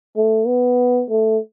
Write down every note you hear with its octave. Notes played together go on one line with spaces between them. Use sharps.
A3
B3
A3